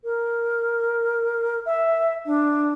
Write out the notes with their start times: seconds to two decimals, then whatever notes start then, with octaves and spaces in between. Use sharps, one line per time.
0.04 A#4
1.65 E5
2.25 D4